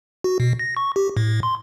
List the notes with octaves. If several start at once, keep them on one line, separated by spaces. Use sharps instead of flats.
F#4
B2
A#6
C#6
G4
A2
C6